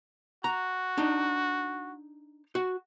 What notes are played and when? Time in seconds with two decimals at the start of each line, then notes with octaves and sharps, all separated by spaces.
0.44 F#4 A#5
0.98 D4 D#4
2.55 F#4